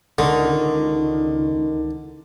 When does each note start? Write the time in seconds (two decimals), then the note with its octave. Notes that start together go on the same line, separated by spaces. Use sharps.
0.18 C#2 D3 D#3